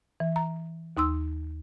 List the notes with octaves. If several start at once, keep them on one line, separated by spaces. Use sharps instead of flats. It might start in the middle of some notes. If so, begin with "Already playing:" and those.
E3
A#5
D#2 D#4 C6 E6